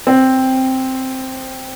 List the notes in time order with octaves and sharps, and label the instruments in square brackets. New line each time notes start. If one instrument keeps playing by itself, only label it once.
[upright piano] C4